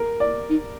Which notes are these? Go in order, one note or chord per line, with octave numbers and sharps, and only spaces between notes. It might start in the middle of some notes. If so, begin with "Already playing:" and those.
Already playing: A#4
D5
D#4